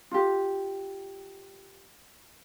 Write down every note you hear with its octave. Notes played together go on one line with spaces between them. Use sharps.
F4 G4